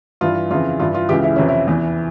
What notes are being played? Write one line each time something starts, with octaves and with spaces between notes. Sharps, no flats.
G2 E3 F4
F2 C#3 E3 F4
G2 E3 F4
F4
C#2 C#3 E3 G4
E4
F2 C3 E3 C#4
E4
E2 E3